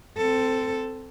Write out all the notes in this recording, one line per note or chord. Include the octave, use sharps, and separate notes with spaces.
C4 A4